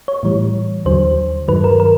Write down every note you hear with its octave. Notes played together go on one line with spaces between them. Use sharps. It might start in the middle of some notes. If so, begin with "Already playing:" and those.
C#5
A2 E3 G3
D#2 D3 F#3 C5
G2 D#3 F#3 B4
A#4
A#4